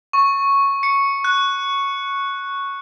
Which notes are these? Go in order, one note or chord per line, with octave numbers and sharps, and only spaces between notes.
C#6
C#7
F#6